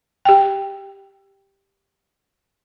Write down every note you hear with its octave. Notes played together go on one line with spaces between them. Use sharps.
G4 G5